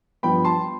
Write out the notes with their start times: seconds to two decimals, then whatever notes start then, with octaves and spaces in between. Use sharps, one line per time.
0.23 G2 F3 B3 G5 B5
0.45 A5 C6